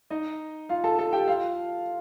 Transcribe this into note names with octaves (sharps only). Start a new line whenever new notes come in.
D#4 D#5
F4 F5
A4 A5
A4 A5
G4 G5
F4 F5